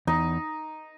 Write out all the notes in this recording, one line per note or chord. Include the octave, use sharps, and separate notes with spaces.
E2 D#4